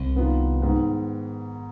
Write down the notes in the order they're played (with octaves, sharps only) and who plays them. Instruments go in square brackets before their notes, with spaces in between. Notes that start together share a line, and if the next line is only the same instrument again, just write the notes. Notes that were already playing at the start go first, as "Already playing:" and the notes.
Already playing: [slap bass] C2 C3
[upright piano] D#3 B3 F4
G#2 D#3 B3